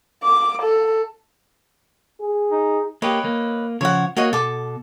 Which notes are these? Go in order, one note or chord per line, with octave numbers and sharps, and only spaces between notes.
D6
A4
G#4
D#4
A#3 G4 B4 C#5 D#5
A#3
C#3 F3 C#5 F#5
A#3 F#4 C#5 D#5
B2 A4 D6